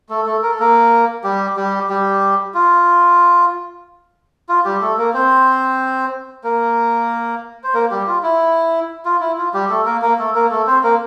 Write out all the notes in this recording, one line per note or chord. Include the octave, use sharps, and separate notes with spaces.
A3 A4
A3 A4
A#4
A4
A#3 A#4
G3 G4
G3 G4
G3 G4
F4
F4
G3 G4
A3 A4
A#3 A#4
C4 C5
A#3 A#4
C5
A#3 A#4
G3 G4
F4
E4
F4
E4
F4
G3 G4
A3 A4
A#3 A#4
A#3 A#4
A3 A4
A#3 A#4
A3 A4
C4 C5
A#3 A#4